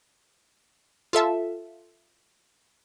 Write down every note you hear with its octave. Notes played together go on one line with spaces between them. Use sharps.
F4 A4 E5 A5